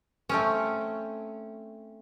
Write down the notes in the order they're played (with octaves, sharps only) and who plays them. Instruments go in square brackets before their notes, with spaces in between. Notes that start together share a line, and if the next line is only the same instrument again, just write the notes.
[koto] A3 C4 C#4